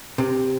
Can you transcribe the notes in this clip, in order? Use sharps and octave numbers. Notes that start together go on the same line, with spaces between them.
C3